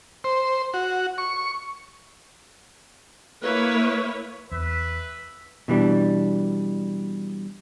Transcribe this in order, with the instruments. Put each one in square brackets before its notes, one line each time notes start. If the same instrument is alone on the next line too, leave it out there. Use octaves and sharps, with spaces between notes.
[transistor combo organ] C5
F#4
C#6
[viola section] A#3 E4 B4 C#5
[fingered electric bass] E2 [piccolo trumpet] B4 [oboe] E5
[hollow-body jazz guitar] B2 E3 G3 D4